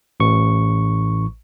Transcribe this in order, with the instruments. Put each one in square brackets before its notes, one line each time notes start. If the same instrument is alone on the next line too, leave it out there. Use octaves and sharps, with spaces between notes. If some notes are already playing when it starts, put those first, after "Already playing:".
[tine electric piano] A1 C#6